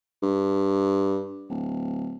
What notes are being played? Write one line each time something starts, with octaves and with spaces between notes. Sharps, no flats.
G2
D1